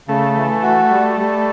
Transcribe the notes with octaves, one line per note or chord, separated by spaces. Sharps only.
C#3 A3
E3
F#4
G3
G3